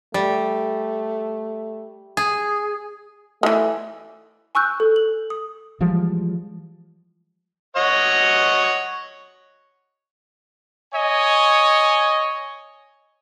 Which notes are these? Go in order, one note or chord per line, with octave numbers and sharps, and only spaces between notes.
G3 A3
G#4
D#3 E3 A3
G#5 C#6 E6 F#6 G6
A4
F#7
D#6
E3 F3 G3 G#3
C#5 D#5 F#5
C#5 D#5 G#5